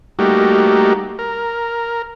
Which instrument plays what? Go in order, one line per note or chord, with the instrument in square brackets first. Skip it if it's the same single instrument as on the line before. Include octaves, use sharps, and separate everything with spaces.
[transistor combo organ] G3 A3 A#3 D#4 F#4 G4
A#4